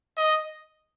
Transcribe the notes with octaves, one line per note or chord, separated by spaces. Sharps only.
D#5